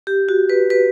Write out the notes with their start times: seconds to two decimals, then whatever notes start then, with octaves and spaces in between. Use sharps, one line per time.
0.07 G4
0.29 F#4
0.50 B4
0.70 B4